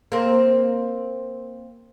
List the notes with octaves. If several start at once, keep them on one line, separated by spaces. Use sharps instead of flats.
A#3 C4